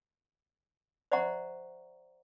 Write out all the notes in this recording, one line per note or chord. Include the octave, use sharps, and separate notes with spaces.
C5 D5 E5 F#5 A#5 C#6